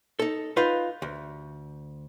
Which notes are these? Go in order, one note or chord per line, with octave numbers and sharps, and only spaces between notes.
D#4 A4
D#4 F4 B4 F#5
D2